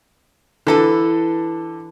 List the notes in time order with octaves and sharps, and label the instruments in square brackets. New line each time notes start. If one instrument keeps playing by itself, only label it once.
[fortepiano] D3 A4 [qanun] E3 E4 B4